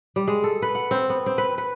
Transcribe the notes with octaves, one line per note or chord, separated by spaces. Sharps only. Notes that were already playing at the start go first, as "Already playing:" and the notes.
G3
G#3
A4
B4
F#5
C4
B3
C4
B4
B4